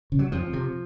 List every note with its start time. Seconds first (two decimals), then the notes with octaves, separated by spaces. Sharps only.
0.12 C#3
0.19 F#3
0.32 F2 F3
0.53 C3